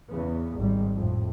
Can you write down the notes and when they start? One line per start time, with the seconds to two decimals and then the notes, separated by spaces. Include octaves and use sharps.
0.10 E2 C#3 B3
0.57 G#1 G3
0.94 F2 A2